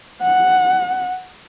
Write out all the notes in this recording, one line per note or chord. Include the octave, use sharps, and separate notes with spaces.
F#5